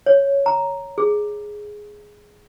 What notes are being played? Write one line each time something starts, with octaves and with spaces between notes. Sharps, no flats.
C#5
A#5
G#4